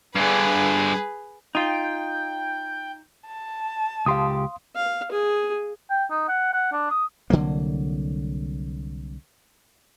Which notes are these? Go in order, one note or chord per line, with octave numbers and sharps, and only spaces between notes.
G2 D3 G#4 B4
D#4 F4 G5
A5
C#2 G4 F5 C6 D#6
F5
G#4
G5
D#4
F#5
F#5
D4
D#6
C2 D3 F#3 A#3